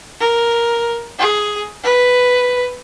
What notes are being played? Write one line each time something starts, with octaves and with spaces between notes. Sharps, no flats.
A#4
G#4
B4